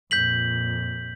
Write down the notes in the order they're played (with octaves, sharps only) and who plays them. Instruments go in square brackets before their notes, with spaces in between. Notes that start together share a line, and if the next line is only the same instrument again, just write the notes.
[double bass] F2 A#2 [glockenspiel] G6 B6 F#7